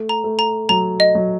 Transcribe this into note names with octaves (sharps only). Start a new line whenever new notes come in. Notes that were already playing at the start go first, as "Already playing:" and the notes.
Already playing: A3
A#5
A3
A#5
F#3 A#5
D#5
F#3